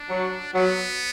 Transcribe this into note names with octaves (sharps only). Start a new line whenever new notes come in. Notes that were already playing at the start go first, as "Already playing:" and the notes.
Already playing: D4
F#3
F#3 B3